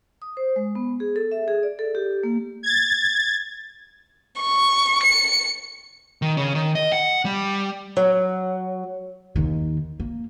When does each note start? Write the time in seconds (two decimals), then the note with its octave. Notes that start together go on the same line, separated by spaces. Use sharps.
0.22 D#6
0.37 C5
0.56 G#3
0.75 B3
1.00 G#4
1.16 A4
1.32 E5
1.48 G#4
1.63 D5
1.79 A4
1.95 G4
2.23 A#3
2.63 G#6 A6
4.41 C#6
5.04 C#7
6.22 D#3
6.37 C#3
6.55 D#3
6.75 D#5
6.93 F#5
7.25 G3
7.97 F#3
9.36 D#2 D#3
10.00 A#3